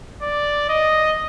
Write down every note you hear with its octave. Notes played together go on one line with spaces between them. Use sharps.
D5
D#5